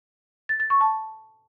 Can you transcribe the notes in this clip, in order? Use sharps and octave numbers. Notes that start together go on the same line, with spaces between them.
A6
A6
C#6
A5